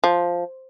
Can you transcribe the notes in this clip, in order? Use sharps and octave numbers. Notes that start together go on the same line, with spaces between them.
F3